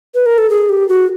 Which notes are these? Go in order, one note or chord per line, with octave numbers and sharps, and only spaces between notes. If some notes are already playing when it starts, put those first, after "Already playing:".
B4
A#4
A4
G#4
G4
F#4